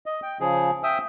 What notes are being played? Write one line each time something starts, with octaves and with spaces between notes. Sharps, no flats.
D#5
G5
C#3 F3 G#4
E5 G5 D#6 E6